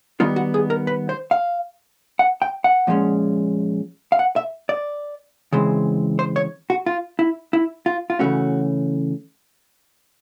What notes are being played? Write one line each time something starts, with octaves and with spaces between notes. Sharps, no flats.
D#3 G3 B3 D#4 F4
F#4
G#4
A#4
B4
C5
F5
F#5
G5
F#5
A#2 F3 G#3 C#4
F5
F#5
E5
D5
C#3 E3 G#3 C4
C5
C#5
F#4
F4
E4
E4
F4
F4
C#3 E3 A3 C#4 F#4